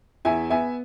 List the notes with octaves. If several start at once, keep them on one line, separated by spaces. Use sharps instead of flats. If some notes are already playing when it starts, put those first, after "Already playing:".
E2 E5 G#5
B3 E5 G#5